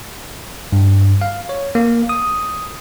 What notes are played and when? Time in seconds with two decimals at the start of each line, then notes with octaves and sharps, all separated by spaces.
0.72 G2
1.21 F5
1.49 C#5
1.75 A#3
2.09 D#6